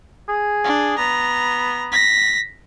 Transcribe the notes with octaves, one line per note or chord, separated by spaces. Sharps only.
G#4
D4
B3 A#5
A#6 B6